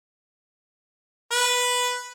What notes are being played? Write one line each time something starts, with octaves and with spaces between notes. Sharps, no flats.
B4